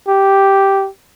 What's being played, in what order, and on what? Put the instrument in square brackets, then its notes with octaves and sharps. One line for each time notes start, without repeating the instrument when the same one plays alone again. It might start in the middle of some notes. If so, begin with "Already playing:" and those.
[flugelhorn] G4